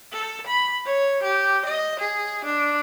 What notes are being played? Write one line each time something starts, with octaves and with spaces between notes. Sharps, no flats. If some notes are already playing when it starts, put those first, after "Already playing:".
A4
B5
C#5
G4
D#5
G#4
D4